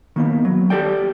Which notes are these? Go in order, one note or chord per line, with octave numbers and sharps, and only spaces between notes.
D#3 A#3 B3
F#3
G4 A4 D5 G5